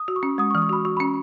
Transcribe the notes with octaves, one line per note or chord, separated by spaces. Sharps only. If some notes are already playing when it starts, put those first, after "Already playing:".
Already playing: D#6
F#4
C#6
C#4
G#3 D#6
C#6
E3 D#6
C#6
F#4 B5
F#4 C#6
C#4 B5